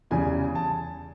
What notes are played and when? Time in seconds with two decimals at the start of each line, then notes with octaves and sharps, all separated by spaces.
0.11 E2 C#3 E3 G3 G#5
0.55 A5